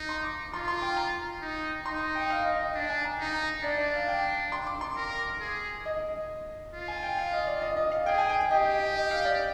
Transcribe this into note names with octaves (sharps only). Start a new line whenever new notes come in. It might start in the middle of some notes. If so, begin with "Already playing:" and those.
Already playing: D#4
C6
D6
F4 C6
C6
G5
A#5
D#4
D#4 C6
G5
F5
D#5
D#5
D4
G#5
A#5
D#4 A#5
A#5
D4 D5
D5
F5
G5
C6
D6
C6
A#4
G#4
D#5
F4
G#5
G5
F5
D#5
D5
D#5
D#5
F5
G#4 G5
G#5
G5
G5
G4 D#5
D#5
F5
D5